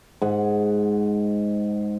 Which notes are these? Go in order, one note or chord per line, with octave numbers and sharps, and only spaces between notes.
G#2 F#5